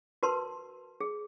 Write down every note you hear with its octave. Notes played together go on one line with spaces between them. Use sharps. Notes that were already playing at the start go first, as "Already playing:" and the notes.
F#4 A#4 B4 A5 C6
G#4